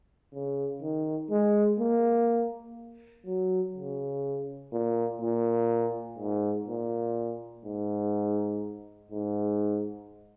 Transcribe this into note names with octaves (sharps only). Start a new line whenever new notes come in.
C#3
D#3
G#3
A#3
F#3
C#3
A#2
A#2
G#2
A#2
G#2
G#2